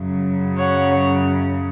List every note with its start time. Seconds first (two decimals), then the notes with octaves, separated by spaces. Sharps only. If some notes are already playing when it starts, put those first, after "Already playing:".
Already playing: F#2 C#3 F#3
0.56 C#5 F#5